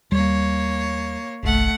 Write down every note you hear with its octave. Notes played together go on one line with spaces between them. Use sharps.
D#2 G3 A#3 C#5
G1 C2 A3 F#5